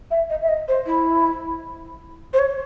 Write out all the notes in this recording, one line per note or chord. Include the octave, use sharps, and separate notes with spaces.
E5
D#5
E5
D#5
C5
E4
C5
C#5